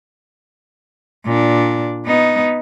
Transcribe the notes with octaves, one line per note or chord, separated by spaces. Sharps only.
A#2 D4
B3 D#4